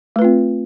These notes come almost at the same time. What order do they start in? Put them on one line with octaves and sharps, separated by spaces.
A3 B4 F4 C4